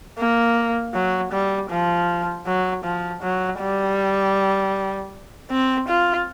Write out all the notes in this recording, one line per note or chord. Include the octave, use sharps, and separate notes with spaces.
A#3
F#3
G3
F3
F#3
F3
F#3
G3
C4
F4